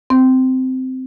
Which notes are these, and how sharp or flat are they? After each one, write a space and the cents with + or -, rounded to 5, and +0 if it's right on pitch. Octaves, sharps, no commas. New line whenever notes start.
C4 -15